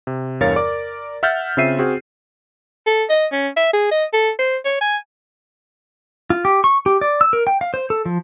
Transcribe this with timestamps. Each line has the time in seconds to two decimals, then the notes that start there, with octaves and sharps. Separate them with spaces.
0.07 C3
0.40 E2 G2 A#4 C#5 F5 A6
0.56 A#4 D5 D6
1.23 E5 F#5 F6 G6 A6
1.57 C#3 C4 F4 E5 C7 D#7
1.79 C4 F#4 G#4
2.86 A4
3.09 D#5
3.32 C#4
3.56 E5
3.73 G#4
3.91 D#5
4.13 A4
4.39 C5
4.64 C#5
4.80 G#5
6.30 F4
6.45 G4
6.64 C#6
6.86 G4
7.01 D5
7.21 E6
7.33 A#4
7.47 G5
7.61 F5
7.74 C5
7.90 A4
8.06 F3